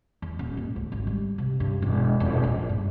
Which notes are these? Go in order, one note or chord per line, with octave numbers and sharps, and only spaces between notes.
E2
D#1
G#2
D2
G#1
G3
C3
G2
E1
E1
A#1
G2